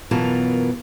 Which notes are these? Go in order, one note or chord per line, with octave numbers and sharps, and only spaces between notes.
F#2 B2 E3 F4 A#4 A5